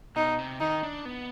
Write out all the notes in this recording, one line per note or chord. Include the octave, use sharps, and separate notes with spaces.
B2 D#4
C3
D#3 D#4
D4
B3